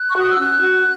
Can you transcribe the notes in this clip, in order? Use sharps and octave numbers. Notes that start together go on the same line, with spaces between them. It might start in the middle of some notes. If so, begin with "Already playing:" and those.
Already playing: F#6
C#6
F#4 D#6
E6
C#4 F#6
F#4